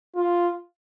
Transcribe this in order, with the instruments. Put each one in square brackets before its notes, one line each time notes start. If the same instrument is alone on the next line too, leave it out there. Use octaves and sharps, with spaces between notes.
[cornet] F4